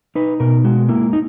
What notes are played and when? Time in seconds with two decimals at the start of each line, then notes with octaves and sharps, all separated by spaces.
0.15 D#4 B4
0.40 B2 A#4
0.64 G#3 F#4
0.89 A#3 E4
1.13 D#4